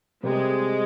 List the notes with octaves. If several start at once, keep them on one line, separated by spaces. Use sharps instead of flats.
C3 G3 G#3 C4 G4 A#4